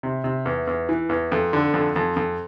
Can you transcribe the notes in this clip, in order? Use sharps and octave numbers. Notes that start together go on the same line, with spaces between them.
C3
C3
E2
E2
E3
E2
F2
D3
F2
F2
F2